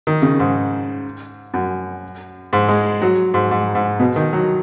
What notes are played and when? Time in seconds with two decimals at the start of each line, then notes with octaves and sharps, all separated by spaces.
0.07 D#3
0.22 C#3
0.39 G#2
1.54 F#2
2.53 G#2
2.68 G#3
3.02 F#3
3.34 G#2
3.51 G#2
3.75 G#2
4.00 B2
4.16 D#3
4.33 F#3